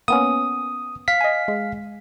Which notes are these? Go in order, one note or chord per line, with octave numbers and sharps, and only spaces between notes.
A#3 B3 C#4 D#6
F5 B6
D#5 G#5
G#3